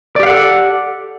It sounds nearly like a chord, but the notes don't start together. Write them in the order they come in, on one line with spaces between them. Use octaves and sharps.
D5 G4 F5 F#5 A4